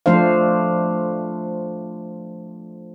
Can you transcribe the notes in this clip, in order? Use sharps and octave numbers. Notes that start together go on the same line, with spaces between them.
F3 A3 D4 C5 F5